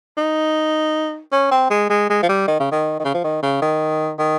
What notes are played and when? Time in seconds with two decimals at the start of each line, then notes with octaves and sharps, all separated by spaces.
0.17 D#4
1.32 C#4
1.51 C4
1.70 G#3
1.90 G#3
2.10 G#3
2.23 F3
2.29 G3
2.48 D#3
2.60 C#3
2.72 D#3
3.00 D#3
3.05 C#3
3.14 F3
3.24 D#3
3.43 C#3
3.62 D#3
4.19 D#3